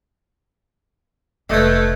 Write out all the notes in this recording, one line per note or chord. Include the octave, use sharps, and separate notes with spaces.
F1 A#2 A3 B4 D5 D#5 G6 G#6